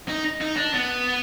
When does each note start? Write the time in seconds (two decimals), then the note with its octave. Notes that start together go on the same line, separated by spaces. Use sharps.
0.08 D#4
0.41 D#4
0.57 D4
0.74 B3